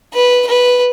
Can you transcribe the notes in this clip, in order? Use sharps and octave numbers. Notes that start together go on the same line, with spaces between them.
B4
B4